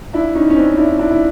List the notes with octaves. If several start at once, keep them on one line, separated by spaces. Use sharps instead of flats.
D4 E4
C#4 D#4
C#4
C4 D4
D4 E4
D4 E4
E4